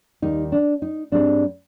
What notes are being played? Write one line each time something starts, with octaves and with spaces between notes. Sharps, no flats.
D#2 D#3 G3 D#4
D4
D#4
G#2 G3 C4 D4